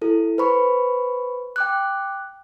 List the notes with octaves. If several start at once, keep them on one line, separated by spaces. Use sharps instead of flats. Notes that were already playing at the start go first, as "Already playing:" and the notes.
E4 A4
B4 C5 B5 C#6
G5 D6 F#6